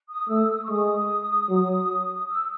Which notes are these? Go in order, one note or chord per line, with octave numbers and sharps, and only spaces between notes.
D#6
A3 E6
E6
D#6
C#6
G#3 D#6
F#3
E6